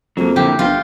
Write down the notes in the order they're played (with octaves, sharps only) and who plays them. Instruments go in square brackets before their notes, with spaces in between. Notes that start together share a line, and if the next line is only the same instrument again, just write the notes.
[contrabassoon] F2 [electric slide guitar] F#3 A#3
[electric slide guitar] D3 A#3 E4 [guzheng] G4
[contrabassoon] G1 [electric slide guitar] F#2 F#4 G5 [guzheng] F4